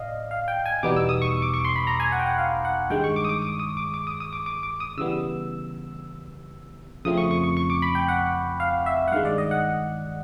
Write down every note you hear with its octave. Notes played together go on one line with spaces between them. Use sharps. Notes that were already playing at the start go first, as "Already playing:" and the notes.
Already playing: A2 D5 D#5 F5
F5
G5
G#5
E2 B2 G3 B3 D#4 D6
E6
D#6
C#6
D6
C#6
C6
B5
A#5
G#5
F#5
G5
F#5
F5
F#5
G2 D#3 G#3 G5
C#6
D6
D#6
D6
D#6
D#6
D6
D6
D#6
D#6
D6
D6
D6
D#6
C#3 E3 G3 B3 E6
F2 C#3 F3 A3 C4 D#6
C#6
C#6
C#6
C#6
D6
B5
G5
F#5
F5
E5
F#5
G2 D#3 G#3 F5
D5
D#5
F#5